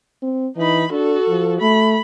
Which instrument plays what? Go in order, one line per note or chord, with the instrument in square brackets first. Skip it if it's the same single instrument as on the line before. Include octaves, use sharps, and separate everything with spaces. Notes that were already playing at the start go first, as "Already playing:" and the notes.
[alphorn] C4
[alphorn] E3 [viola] D#4 B5
[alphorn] D4 [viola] F#4 A4
[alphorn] F3
[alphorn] A3 [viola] B5